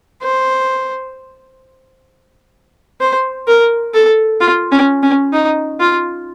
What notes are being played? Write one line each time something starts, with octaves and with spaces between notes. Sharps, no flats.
C5
C5
A#4
A4
F4
C#4
C#4
D#4
F4